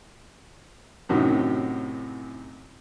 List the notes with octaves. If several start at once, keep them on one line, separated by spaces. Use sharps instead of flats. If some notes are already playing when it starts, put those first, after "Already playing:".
F#2 A2 C3 D#3 F#3